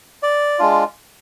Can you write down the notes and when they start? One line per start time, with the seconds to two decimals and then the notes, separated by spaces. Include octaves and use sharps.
0.23 D5
0.59 G#3 D4 F4